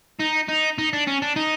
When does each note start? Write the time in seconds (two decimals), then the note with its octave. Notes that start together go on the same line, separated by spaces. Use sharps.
0.20 D#4
0.49 D#4
0.78 D#4
0.93 D4
1.07 C#4
1.22 D4
1.36 D#4